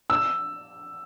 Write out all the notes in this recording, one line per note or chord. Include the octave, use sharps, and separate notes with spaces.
E6